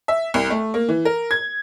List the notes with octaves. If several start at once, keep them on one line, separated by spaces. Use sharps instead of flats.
E5
C2
A3
A#3
E3
A#4
G#6